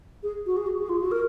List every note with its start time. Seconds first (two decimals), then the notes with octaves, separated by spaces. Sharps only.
0.23 G#4
0.46 F#4
0.56 G#4
0.67 F#4
0.78 G#4
0.89 F4
1.00 F#4
1.11 A#4